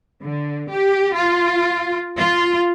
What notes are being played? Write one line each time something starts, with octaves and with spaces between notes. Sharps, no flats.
D3
G4
F4
F4